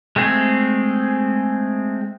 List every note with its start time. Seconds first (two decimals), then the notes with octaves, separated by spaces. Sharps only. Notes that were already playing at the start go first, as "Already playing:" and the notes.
0.16 G#3 A3 C4 G#4